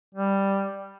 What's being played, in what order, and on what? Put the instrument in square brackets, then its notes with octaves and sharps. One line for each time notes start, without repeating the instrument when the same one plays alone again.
[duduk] G3